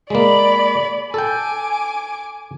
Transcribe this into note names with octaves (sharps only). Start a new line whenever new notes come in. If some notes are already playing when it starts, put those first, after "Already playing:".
G#3 A#3 D5 B5
A4 G5 G#5 D6